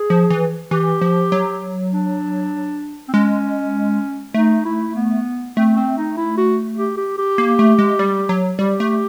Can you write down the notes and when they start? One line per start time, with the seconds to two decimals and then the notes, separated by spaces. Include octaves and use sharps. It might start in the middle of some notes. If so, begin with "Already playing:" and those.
Already playing: G#4
0.10 F3
0.30 E3
0.71 E3 G4
1.02 F3
1.32 F#3
1.92 D4
3.08 C4
3.14 G#3 C#4
4.34 A3 D#4
4.65 E4
4.95 B3
5.56 A3 C4
5.76 C4
5.97 D#4
6.17 E4
6.38 F#4
6.77 G4
6.97 G4
7.18 G4
7.38 A#3
7.59 A3
7.79 G#3
7.99 G3
8.29 F#3
8.59 G3 G4
8.80 A3